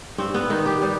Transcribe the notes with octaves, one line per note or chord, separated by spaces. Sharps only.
G2 C4
B3
D#3 D#4
G4
G3